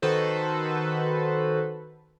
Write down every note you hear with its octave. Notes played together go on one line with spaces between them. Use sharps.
D#3 F#4 A4 B4 C5